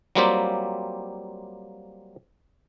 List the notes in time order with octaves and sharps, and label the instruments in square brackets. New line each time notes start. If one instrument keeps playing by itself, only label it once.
[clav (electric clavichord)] F#3 G3 A#3 C4 F4 G4